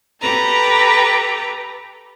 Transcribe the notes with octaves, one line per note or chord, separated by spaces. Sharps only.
G4 A4 B4 A#5